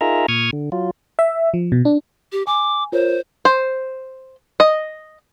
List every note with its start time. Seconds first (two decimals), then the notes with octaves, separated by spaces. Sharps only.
0.01 D#4 F4 G#4 A#4 E5 A#5
0.28 A#2 C#6 D#6 F6 G#6
0.53 D3
0.72 F#3 F4
1.19 E5
1.54 F3
1.72 B2
1.85 D4
2.32 G4
2.47 G#5 D6
2.92 F4 A#4 C5 C#5
3.45 C5
4.60 D#5